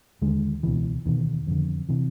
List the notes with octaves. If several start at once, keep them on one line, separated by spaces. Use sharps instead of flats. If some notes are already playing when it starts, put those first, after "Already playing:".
D#2 D3 G#3
C#2 B2 E3
E2 B2 D#3
F2 D3
C3 E3